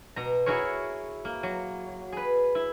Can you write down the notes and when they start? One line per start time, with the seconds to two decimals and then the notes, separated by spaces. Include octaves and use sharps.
0.16 B2 A#5
0.46 E4 F#4 G#4 A#4 C#5
1.25 A#3
1.43 F#3
2.12 G#4 B4
2.55 E4